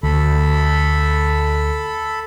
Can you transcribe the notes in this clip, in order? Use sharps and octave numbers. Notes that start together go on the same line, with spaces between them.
D2 A4 B5